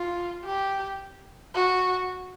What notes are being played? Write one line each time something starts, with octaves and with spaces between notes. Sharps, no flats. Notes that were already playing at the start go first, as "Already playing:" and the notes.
Already playing: F4
G4
F#4